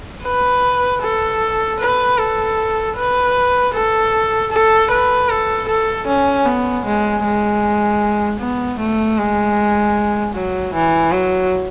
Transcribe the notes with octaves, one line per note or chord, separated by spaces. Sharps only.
B4
A4
B4
A4
B4
A4
A4
B4
A4
A4
C#4
B3
G#3
G#3
B3
A3
G#3
F#3
E3
F#3